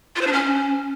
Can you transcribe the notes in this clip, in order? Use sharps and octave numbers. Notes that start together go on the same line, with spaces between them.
F4
C5
D4
C#4